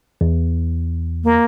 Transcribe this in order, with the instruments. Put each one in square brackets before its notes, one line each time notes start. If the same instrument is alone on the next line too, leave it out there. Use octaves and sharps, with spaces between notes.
[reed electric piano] E2
[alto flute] A#3